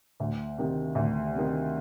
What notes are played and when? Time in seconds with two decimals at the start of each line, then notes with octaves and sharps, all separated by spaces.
0.20 D2
0.58 C3 D#3
0.95 D2
1.34 C3 D#3